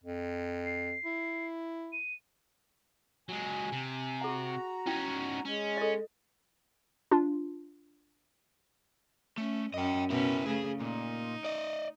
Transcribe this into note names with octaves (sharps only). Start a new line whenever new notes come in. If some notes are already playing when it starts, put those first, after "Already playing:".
F2
C7
E4
D#7
F#3 G#3 G#5
C3
F#4 G#4 F#5 A#5
C#4 D#4 E4 G5
G#3 C#4
A4 D#5
D4 F4
A3 C#4
F#2 C#4 D#5 G5
B2 C#4 E4 A#4 B4
C#3 A3 G#4
A#2 D#4
D5 D#5